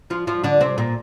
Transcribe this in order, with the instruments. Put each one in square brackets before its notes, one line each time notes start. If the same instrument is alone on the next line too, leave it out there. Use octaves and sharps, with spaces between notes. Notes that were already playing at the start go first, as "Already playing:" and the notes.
[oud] F3 F4
F3 F4
D3 D4
C3 C4
A#2 A#3